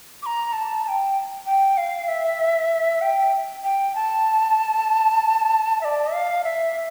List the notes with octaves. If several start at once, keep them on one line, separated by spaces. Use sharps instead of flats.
D6
A#5
A5
A5
G5
G5
F5
E5
G5
G5
A5
E5
D5
F5
E5